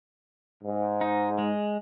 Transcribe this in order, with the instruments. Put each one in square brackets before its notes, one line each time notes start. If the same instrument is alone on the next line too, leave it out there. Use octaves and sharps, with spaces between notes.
[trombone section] G#2
[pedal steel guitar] D#4
G#3